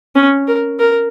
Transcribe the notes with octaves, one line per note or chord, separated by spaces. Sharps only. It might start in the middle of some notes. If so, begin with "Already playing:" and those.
C#4
A#4
A#4